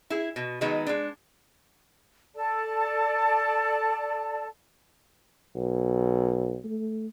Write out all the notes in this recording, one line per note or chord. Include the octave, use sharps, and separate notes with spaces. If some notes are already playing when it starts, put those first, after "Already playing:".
E4 G#4
B2
D#3 F#3 G#3 B3
G#3 D4
A4 D5 A5
B1
A3